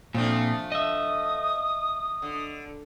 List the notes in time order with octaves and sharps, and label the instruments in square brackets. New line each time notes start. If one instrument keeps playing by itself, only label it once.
[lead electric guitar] A#2 C4 [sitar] F3 A3 D4
[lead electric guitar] D#5 E5 [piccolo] D#6
[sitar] D3